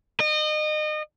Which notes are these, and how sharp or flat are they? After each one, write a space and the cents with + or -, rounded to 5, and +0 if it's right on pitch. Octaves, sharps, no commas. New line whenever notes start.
D#5 -30